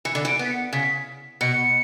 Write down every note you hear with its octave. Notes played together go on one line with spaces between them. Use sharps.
E3 C#7
D3
E3
D7
B3
B6
C#7
C#3 B6
B2 C#7